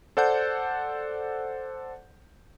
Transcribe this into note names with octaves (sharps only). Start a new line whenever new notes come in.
A4 C5 D5 F#5 A5 G6